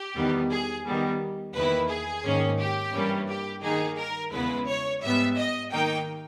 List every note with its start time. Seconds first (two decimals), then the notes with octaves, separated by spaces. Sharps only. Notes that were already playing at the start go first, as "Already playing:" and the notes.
Already playing: G4
0.15 E2 D#3 G3 B3
0.50 G#4
0.85 D#3 G3 B3
1.54 E2 D#3 A#3 E4 B4
1.89 G#4
2.24 G#2 D#3 A#3 C#4
2.59 G4
2.94 G2 E3 G3 A#3 C#4
3.28 G4
3.63 D#3 A#3 D#4 G#4
3.98 A#4
4.32 E2 C#3 G#3 B3 E4 B4
4.67 C#5
5.02 G#2 G3 B3 E5
5.37 D#5
5.72 D#3 A#3 D#4 G5